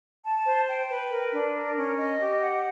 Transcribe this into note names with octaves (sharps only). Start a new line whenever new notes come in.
A5
C5
G5
B4
A#4
D4
A#4
C#4
D#5
G4
F#5